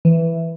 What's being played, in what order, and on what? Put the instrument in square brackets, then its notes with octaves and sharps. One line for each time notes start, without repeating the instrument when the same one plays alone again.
[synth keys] E3